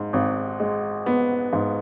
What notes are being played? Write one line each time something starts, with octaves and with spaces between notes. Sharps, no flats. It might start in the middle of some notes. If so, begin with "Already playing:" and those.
Already playing: G#2
G#1
G#3
B3
G#2